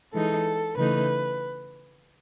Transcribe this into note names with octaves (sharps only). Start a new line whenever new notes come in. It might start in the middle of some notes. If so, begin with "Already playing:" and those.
E3 G#3 D#4 A4
C#3 E3 A3 D#4 B4